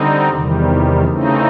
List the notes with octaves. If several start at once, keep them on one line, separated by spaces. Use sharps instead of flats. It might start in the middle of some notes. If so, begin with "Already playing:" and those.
Already playing: D3 G3 C4 D#4
E2 C3 D#3 G3
C#3 E3 A3 C4 D#4